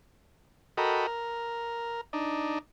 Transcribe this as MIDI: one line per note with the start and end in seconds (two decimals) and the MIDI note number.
0.77 1.07 66
0.77 1.07 69
0.77 1.07 70
0.77 1.07 75
0.77 1.07 79
0.77 1.07 83
1.07 2.01 70
2.13 2.59 62
2.13 2.59 63